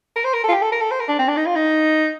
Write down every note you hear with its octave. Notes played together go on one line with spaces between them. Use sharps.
A#4
C5
A#4
A4
F4
G4
A4
A#4
A4
C5
A#4
D4
C4
D4
D#4
F4
D#4